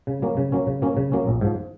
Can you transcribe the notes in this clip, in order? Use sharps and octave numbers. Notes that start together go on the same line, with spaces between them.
C#3
F#3 A#3 C#4
C#3
F#3 A#3 C#4
C#3
F#3 A#3 C#4
C#3
F#3 A#3 C#4
A#1
G#2 F3